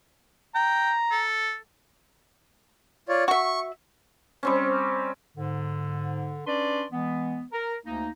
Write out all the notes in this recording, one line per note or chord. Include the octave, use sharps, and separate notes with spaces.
G5 A#5
A4
F4 C#5 D5
F#4 E5 C#6
G3 C4 C#4
G#2 D3
C#4 D4 B4 D5 C6
E3 G#3 B3
A#4
D2 A#3 D#4